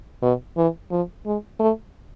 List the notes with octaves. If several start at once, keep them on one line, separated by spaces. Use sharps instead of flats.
B2
E3
F3
G#3
A3